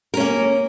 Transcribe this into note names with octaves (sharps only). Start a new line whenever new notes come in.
A#3 C#4 A#4